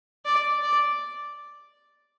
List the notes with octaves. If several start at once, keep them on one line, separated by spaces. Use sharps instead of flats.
D5
D5